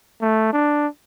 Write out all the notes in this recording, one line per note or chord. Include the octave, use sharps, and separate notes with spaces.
A3
D4